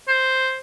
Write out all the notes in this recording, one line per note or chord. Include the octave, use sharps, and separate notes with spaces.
C5